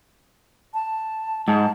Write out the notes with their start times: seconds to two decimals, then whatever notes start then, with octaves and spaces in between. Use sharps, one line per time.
0.74 A5
1.48 G#2 A5